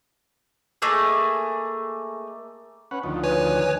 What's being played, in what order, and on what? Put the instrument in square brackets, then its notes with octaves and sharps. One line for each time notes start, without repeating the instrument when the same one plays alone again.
[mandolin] A3 A#3 G#4 D#5
[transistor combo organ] C#4 B4 F#5
D2 D#3 F3
[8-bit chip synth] B4 C#5 G#5